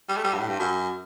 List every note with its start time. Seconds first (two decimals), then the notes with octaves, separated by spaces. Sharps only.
0.09 G3
0.17 A3
0.24 G3
0.34 G2
0.39 A2
0.48 G2
0.59 F#2